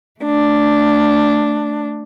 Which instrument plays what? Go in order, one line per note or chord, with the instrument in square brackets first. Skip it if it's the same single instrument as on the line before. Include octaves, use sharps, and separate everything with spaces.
[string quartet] A3 D4